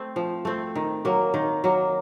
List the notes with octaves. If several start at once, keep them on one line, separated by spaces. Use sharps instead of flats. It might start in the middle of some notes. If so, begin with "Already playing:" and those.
Already playing: A3 C4
F3
A3 C4
D#3
F#3 A#3
D#3
F#3 A#3